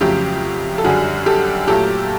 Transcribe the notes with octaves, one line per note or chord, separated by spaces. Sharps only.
F2 C#3 F#3 A3 G4
A4
F#2 D3 G3 F#4 G#4
G4 A4
A#2 F#3 A3 G4 A4